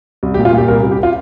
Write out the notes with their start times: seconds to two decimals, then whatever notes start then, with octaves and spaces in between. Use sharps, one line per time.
0.23 C2
0.34 G4
0.38 A#2
0.45 F4
0.53 A#2 G4
0.68 C2 A#4
0.83 C2
0.91 G4
1.03 F4